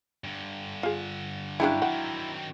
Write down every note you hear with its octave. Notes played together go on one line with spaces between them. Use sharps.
G2 D3
F4 G#4
F#3 C#4 D4 E4 G#4 F5 G5 G#5
D#3 C4 F#5